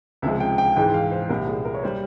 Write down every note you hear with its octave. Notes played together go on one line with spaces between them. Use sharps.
C#2 C3 F3 G#3 E5
G5
G5
G#2 E3 G#3 G5
F5
C5
C2 A#2 G3 A#4
G#4
A#4
C#5
G3 C5